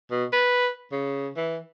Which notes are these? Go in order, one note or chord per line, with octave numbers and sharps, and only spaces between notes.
B2
B4
C#3
E3